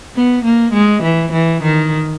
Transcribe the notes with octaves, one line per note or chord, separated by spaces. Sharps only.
B3
A#3
G#3
E3
E3
D#3